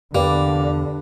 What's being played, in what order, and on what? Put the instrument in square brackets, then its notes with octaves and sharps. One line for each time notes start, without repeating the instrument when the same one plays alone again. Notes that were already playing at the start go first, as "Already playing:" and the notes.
[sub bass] E2 [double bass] D3 [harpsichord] A#3 [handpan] G4 B4 D5